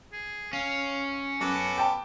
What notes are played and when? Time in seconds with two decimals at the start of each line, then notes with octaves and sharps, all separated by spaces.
0.12 G#4
0.53 C#4 F5
1.41 F#2 B3 F#4 A4 D6
1.78 G5 A5